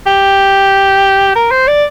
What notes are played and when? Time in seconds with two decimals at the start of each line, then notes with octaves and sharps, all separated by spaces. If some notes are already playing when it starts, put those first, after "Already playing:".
0.07 G4
1.36 A#4
1.51 C5
1.68 D5